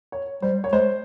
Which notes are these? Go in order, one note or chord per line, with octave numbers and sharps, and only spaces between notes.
C#5
G3 C5
C#5
G#3 C5